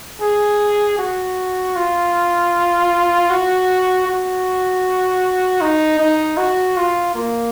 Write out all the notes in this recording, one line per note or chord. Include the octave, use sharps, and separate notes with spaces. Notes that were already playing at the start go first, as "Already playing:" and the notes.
G#4
F#4
F4
F#4
F#4
D#4
D#4
F#4
F4
A#3